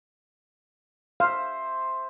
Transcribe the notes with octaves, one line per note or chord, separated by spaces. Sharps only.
C5 E5 F5